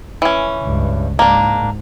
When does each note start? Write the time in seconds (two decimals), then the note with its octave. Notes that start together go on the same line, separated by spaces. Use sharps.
0.22 E3 C#4
0.62 C#2 G2
1.19 G#2 A#3 D4